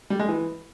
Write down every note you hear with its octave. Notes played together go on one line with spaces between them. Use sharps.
G3
G#3
E3